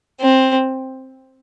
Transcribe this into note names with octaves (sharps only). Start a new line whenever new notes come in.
C4